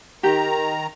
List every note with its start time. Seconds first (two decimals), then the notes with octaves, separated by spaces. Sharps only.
0.23 D#3 G4 A#5